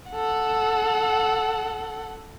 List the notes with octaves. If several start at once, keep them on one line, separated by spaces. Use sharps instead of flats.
A4 F#5